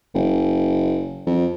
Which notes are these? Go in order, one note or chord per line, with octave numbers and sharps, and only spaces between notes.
F#1
F2